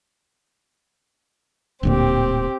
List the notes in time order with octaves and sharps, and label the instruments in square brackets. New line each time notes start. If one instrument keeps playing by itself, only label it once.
[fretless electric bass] D1 D2 A#2 [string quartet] C4 G4